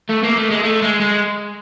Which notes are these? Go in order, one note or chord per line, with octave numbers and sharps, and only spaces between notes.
A3
A#3
A3
G#3
A3
G#3
G#3